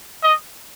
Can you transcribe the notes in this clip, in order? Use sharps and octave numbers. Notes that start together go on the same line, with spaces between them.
D#5